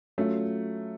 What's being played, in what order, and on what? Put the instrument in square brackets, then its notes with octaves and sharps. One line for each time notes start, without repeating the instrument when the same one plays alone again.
[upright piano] F#3 A3 C#4 F4